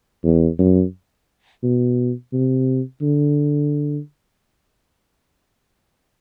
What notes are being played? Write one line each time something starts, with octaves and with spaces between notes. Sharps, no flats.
E2
F#2
B2
C3
D3